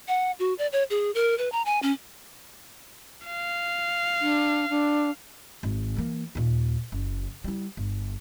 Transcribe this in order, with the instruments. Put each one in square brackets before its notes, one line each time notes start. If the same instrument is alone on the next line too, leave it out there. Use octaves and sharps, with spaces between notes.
[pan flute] F#5
F#4
D5
C#5
G#4
A#4
B4
A#5
G#5
C#4
[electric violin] F5
[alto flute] D4
D4
[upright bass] G#1
E3 A#3
D#2 A#2
F#1
G3 E4
G1